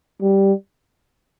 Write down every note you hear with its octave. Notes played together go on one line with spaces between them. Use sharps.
G3